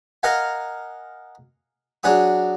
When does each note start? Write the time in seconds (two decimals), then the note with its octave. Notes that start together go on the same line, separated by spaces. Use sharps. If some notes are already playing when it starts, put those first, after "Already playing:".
0.23 A#4 D#5 F5 F#5 G#5
2.03 F#3 D4 G#4 F#5 D#6